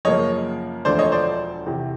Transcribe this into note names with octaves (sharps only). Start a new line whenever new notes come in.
F#2 C#3 F3 A#3 C#5 D#5
E1 D2 D3 F3 A3 C5 D5
C#5 D#5
C5 D5
E2 C3 E3